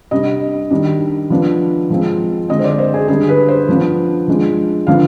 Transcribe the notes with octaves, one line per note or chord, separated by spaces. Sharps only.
C3 G3 D4 D#5
D#3 G3 D4
F3 B3 D4
F3 G#3 C4
D3 G#3 C4 D#5
C5
D5
C5
G#4
D3 G3 D4 G#4
B4
C5
F3 B3 D4
F3 G#3 D4
D3 F3 B3 D4 F5